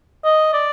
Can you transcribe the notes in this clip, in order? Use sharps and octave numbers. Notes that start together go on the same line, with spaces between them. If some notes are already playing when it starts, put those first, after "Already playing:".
D#5
D5